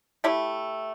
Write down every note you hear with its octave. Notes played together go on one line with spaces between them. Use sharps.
A3 E4 G4